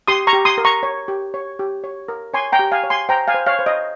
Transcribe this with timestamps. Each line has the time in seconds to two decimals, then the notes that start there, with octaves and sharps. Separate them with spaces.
0.07 G4 C6 D#6
0.27 A#5 C#6
0.33 G4
0.45 C6 D#6
0.58 A#4
0.65 A#5 C#6
0.83 C#5
1.08 G4
1.34 C#5
1.59 G4
1.84 C#5
2.08 A#4
2.34 C#5 G#5 C6
2.52 G5 A#5
2.59 G4
2.72 F5 G#5
2.84 C#5
2.90 G#5 C6
3.09 C5 G5 A#5
3.28 F5 G#5
3.34 C5
3.46 C#5 F5
3.59 C5
3.66 D#5